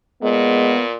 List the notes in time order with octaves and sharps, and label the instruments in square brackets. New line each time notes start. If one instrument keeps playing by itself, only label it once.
[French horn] A#2 [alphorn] G#3 [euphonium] B3